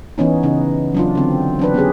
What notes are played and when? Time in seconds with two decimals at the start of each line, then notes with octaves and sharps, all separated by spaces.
0.18 E3 B3 C#4 D#4
0.43 C#3 D#4
0.94 F#3 D4 F4
1.15 D3 C4
1.59 F#3 D4 B4
1.74 B3 C#4 G4 G#4